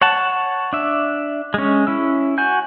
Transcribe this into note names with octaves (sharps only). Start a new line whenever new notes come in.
C#5 F#5 A5
D4 E5
G#3 C#4
C#4 E4 E6
F#4 G#5 G6